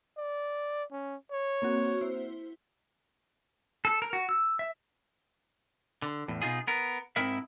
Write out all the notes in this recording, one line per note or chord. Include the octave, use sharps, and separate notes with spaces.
D5
C#4
C#5
A#3 C4 F#4
E4 C5
A4
A#4
F#4
E6
E5
D3
E2 A2
B2 D#4 F4 G#4
B3 A#4
G#2 C4 D#4 E4 A#4 E5